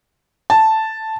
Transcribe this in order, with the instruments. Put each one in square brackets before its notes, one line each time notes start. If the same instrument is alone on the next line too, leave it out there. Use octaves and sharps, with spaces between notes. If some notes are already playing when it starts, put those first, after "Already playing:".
[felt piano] A5